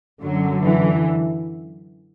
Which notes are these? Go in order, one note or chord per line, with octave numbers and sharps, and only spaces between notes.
F#2 D3 F#3
E3